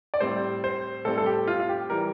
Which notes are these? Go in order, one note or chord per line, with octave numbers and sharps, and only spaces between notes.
D5
A2 G3 C4 C5
C5
A2 G3 C4 A4
A4
G4
F4
F4
G4
E3 G3 A#4